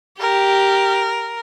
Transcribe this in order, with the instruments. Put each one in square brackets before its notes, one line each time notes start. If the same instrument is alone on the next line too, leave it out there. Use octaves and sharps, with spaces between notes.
[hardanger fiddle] G4 [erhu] A#4